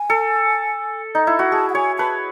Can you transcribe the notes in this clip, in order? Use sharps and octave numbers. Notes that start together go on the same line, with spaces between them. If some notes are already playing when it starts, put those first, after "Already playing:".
Already playing: G#5
A4
D#4
E4
F#4
G#4 A5
F#5
C#5 G#5
B4 A5